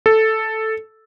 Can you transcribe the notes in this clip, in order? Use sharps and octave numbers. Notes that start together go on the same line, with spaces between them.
A4